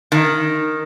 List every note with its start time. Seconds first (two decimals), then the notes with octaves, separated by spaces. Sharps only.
0.12 D#3